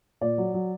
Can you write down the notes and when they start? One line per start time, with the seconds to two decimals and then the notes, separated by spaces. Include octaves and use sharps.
0.21 A#2 D5
0.38 F#3
0.54 F#3